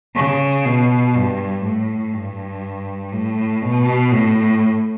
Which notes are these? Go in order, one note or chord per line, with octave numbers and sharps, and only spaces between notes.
C#3
B2
G2
A2
G2
A2
B2
A2